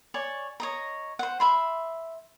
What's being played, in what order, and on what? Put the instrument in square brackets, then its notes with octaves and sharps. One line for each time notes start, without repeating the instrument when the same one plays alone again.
[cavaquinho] C#5 D5 G#5
C#5 D#5 A#5
C5 F#5
E5 B5 C6